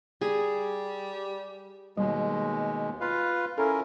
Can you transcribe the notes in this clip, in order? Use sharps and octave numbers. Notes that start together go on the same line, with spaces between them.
G3 G#4
D#2 B2 G3 G#3
F4 B4 F5
C#4 E4 A4 A#4